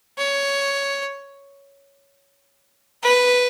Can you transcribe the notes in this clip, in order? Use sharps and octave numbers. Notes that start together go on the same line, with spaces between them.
C#5
B4